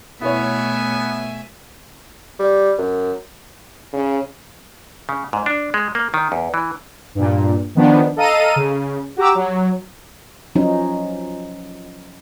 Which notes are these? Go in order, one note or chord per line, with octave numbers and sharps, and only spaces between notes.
B2 A3 B3 E4 B4 C#5 E5 G#5
G3
F#2
C#3
C#3
G#2
D4
G#3
A#3
D#3
E2
E3
G2 A#2
D#3 F3 B3 D4
A4 D#5 F5 A#5 D#7
C#3
F#4 G4 A#5 D6 E6
F#3
F3 F#3 C#4 D#4